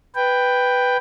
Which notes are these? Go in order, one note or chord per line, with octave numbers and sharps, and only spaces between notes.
B4 G5